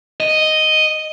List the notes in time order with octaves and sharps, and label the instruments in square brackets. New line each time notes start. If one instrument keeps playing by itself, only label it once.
[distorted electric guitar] D#5